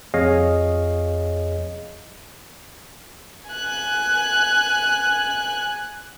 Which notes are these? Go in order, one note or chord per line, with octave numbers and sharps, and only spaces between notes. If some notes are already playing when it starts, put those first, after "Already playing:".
F2 G#4 C#5 D#5 F5
G#5 F#6